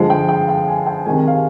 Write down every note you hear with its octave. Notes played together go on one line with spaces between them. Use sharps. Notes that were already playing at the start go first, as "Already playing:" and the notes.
Already playing: D3 F3 G#3
G5
G5
G5
G#5
G5
C3 D#3 G#3 G#5
F5